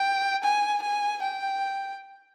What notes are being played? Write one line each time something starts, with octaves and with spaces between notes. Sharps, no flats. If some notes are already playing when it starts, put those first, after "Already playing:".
Already playing: G5
G#5
G#5
G5